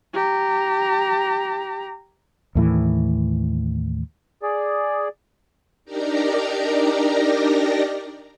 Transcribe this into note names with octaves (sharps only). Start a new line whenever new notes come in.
G4 A#5
D#2 A2 E3
G#4 D5
D4 D#4 G4 A#4 D5 A#5